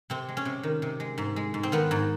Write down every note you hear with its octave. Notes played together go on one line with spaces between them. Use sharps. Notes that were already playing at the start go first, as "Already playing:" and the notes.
C3 C4
G#3
C#4
C3
D#3
C3
G#3
G#2
G#3
G#2
C4
D#3 B3
G#2